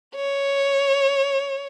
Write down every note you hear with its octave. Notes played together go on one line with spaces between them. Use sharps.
C#5